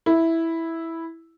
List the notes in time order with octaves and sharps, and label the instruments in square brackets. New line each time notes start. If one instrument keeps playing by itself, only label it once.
[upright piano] E4